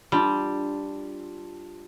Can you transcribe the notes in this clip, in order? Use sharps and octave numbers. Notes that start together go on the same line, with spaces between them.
G3 D4 F4